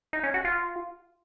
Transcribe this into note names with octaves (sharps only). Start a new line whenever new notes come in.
D#4
C#4
F#4
F4